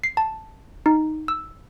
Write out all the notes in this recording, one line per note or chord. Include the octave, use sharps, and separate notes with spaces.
C7
A5
D#4
E6